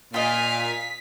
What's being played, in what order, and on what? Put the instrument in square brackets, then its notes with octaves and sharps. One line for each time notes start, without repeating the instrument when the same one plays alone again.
[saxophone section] A#2 [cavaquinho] F4 D#5 [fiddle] F5 G#5 [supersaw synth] B6